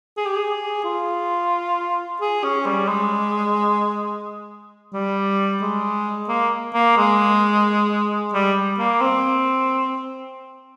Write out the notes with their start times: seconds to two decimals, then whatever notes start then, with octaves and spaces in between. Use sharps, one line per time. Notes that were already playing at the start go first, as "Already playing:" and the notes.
0.17 G#4
0.26 G4
0.37 G#4
0.84 F4
2.21 G#4
2.44 C#4
2.66 G3
2.88 G#3
4.93 G3
5.62 G#3
6.29 A#3
6.74 A#3
6.97 G#3
8.34 G3
8.79 A#3
9.01 C4